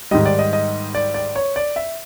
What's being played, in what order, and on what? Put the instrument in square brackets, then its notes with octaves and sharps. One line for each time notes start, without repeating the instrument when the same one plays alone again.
[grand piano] G#2 D#3 G3 D#5
D5
D#5
D#5
D5
D5
C#5
D5
E5